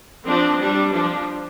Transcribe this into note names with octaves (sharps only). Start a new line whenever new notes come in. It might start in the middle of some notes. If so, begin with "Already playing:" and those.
F3 C4 D4
G3 D4
F3 D4